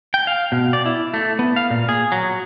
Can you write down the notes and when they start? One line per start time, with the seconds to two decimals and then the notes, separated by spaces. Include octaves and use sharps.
0.14 G5
0.27 F5
0.52 B2
0.73 D5
0.86 E4
1.14 A3
1.39 B3
1.56 F5
1.71 A#2
1.89 G#4
2.12 F#3